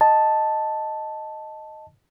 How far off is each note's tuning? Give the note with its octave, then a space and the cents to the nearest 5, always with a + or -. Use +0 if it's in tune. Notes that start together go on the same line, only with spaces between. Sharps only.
D#5 +0 A5 +0